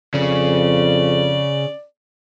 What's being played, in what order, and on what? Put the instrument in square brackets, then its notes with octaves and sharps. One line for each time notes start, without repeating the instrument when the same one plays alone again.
[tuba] F2 [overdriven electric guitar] C#3 [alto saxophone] D5